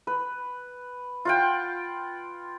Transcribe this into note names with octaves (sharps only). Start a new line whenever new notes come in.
B4
F4 F#5 G5